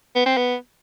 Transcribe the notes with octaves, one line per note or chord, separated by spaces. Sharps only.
B3
C4
B3